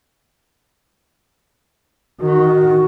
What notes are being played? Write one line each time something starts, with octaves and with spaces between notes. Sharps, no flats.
D#3 F#4